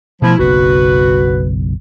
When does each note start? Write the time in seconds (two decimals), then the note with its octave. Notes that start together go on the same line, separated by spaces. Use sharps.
0.22 B2 F3 G3 A3 E4
0.39 F#1 B1 F#4 B4